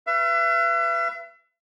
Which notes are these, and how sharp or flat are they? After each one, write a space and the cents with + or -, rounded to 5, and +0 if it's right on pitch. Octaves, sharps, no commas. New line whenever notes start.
B4 +0 E5 +40